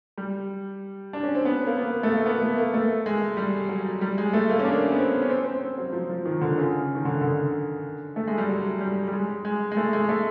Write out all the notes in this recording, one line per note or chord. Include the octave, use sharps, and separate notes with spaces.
G3
D4
C#4
C4
B3
A#3
B3
A3
A#3
B3
A3
A#3
A3
G#3
G3
F#3
G3
G#3
A3
A#3
C#4
D4
B3
C4
C#4
C4
C4
C4
F#3
F3
F3
D#3
D3
C#3
D#3
D3
D3
A3
G#3
G3
F#3
G3
G3
G#3
G#3
G#3
A3
G#3
A3